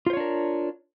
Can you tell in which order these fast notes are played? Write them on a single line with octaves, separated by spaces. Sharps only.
F4 C5 C#5 D4 A#4